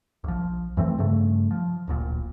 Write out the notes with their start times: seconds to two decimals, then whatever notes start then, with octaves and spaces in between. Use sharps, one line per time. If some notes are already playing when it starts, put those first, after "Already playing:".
0.24 A#1 F3
0.77 F2 E3 A3 C4
0.98 G2 C#3 A3
1.51 F3
1.87 D1 A#1 A#2